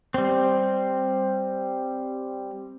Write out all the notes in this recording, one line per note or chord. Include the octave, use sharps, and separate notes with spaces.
G3 C4